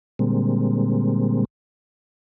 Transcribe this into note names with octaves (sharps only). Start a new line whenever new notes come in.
A#2 D3 G3 G#3 A#3 C4